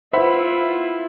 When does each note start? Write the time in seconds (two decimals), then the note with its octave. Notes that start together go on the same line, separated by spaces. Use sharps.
0.13 E4 F4 B4 C5 E5 F#5 B5